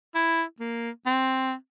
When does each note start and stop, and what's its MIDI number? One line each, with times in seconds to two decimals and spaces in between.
0.15 0.44 64
0.60 0.90 58
1.06 1.54 60